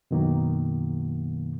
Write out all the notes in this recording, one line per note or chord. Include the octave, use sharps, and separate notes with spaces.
F#2 B2 D#3 F#3 A#3